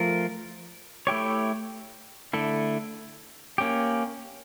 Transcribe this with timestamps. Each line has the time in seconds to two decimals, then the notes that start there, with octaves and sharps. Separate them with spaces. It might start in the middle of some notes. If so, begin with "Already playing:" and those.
Already playing: F3 A3 F4 A#4
1.07 A3 E4 G4 C#5
2.33 D3 A3 E4 A4
3.58 A#3 C#4 G4